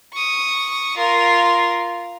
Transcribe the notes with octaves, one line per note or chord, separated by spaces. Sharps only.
C#6 D#6
F4 A#4